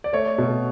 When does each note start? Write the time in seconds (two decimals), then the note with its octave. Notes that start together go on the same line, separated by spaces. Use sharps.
0.04 D5
0.13 A3 C#5
0.38 B2